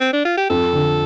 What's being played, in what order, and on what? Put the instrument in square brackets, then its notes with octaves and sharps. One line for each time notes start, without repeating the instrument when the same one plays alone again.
[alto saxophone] C4
D4
F4
G4
[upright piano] F2 [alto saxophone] A4
[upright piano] D3